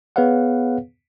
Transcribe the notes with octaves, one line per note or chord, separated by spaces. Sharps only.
B3 G#4 B4 C#5 F5 F#5